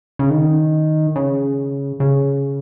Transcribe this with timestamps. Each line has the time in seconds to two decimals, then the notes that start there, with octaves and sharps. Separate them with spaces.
0.19 C#3
0.30 D#3
1.16 C#3
2.00 C#3